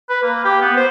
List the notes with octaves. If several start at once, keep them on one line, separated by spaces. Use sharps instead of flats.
B4
A#3
G4
B3
C5